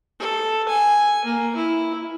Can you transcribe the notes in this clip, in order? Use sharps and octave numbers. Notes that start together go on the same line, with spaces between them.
A4
G#5
A#3
E4